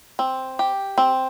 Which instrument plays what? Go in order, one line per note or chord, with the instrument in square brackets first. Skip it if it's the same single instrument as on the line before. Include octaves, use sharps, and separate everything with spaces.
[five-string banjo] C4
G4
C4